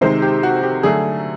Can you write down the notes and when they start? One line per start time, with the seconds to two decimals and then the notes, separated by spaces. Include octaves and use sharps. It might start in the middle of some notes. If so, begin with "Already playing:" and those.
0.01 C3 D#3 G#3 C5
0.22 G4
0.43 F#4
0.63 G4
0.83 D3 F#3 A3 G#4